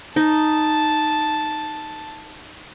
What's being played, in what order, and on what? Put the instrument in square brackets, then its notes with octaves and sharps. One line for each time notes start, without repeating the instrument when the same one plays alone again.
[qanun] D#4 [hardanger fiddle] A5